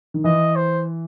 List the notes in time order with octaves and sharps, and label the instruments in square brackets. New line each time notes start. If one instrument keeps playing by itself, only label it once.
[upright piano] D#3
[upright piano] E3 [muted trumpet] D#5
[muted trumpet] C5